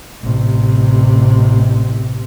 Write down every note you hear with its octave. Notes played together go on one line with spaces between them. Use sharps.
A1 C3